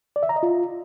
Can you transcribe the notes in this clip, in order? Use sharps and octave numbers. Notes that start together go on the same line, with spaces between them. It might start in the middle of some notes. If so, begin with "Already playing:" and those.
D5
E5
A#5
D#5
F4